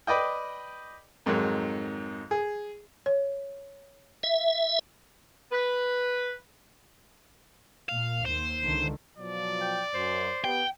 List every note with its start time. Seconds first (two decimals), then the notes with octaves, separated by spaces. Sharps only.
0.07 B4 D5 D#5 G5
1.26 F2 G#2 D#3 F#3
2.31 G#4
3.06 C#5
4.23 E5
5.52 B4
7.89 A#2 F5
8.26 D#2 C5
8.63 C#2 D3 D#3
9.18 B2 F3 F#3 D5
9.61 G5
9.94 F#2 C5
10.44 B3 G4 G5